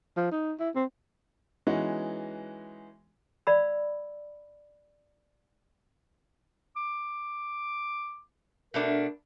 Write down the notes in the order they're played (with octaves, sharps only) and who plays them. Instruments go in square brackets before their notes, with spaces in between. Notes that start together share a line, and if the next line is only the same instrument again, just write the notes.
[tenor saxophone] F3
D#4
E4
C4
[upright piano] E3 G#3 B3 C#4 D#4 F#4
[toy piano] D5 F5 B5 E6
[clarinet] D6
[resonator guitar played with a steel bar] B2 A3 D4 [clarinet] A#4